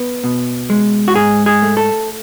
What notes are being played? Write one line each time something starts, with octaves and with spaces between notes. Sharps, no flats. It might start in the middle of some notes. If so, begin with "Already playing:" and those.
Already playing: B3
B2
G#3
F#4
G#2 G#4
G#4
A3
A4